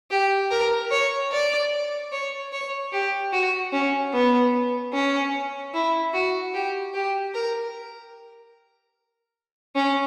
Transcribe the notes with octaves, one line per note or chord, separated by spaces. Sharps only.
G4
A#4
C#5
D5
C#5
C#5
G4
F#4
C#4
B3
C#4
E4
F#4
G4
G4
A#4
C#4